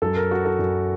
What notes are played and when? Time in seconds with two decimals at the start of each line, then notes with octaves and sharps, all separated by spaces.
0.02 F#2 F#3 A4
0.16 A#4
0.31 F#4
0.45 A4
0.59 F#2 F#3